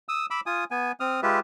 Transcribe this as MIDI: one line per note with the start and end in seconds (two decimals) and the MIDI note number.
0.09 0.26 87
0.09 0.26 88
0.30 0.41 83
0.30 0.41 86
0.30 0.41 88
0.46 0.64 65
0.46 0.64 80
0.46 0.64 87
0.71 0.92 59
0.71 0.92 80
1.00 1.20 60
1.00 1.20 87
1.00 1.20 89
1.23 1.40 56
1.23 1.40 65
1.23 1.40 67
1.23 1.40 71
1.23 1.40 76